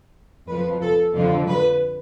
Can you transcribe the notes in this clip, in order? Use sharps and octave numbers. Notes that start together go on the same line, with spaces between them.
F2 F3 B4
A4
F2 D3 F3
B4